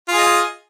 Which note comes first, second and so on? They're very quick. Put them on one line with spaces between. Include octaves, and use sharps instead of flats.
F4 G#4 D#5